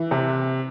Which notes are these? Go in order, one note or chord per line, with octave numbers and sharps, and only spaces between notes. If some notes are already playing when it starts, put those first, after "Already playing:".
Already playing: E3
C3